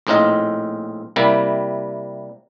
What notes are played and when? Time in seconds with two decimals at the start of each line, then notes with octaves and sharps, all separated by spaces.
0.07 A#1 A2 C4 D#4 F4 D#5
1.16 C3 G3 A#3 E4